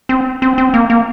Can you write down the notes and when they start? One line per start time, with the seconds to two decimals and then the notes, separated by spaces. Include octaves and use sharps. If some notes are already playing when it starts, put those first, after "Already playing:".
0.09 C4
0.42 C4
0.58 C4
0.74 A#3
0.90 A#3